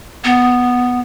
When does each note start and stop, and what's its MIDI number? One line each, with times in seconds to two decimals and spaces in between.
0.24 1.00 59